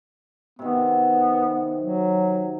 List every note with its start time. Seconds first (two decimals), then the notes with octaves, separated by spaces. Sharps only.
0.59 C3 D#3 B3
1.81 F#3